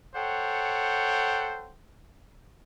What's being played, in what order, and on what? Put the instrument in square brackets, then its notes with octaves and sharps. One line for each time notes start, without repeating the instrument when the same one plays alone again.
[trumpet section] A4 C5 C#5 F#5 G5